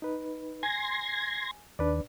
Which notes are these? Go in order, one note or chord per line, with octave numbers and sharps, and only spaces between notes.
D#4 B4
G#5 C6 G#6 A#6
D#2 D4 B4 D5